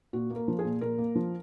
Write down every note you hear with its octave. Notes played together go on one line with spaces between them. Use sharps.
A#2 F#4
A#3
A#4
F3
G#4
A#2
A#2 A#4
A#3
F3